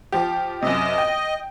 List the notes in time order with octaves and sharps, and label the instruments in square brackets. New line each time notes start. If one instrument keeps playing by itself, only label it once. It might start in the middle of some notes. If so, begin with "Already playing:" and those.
[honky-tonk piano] F3 G4
[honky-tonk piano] F#2 C3 [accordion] D#5
[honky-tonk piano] G5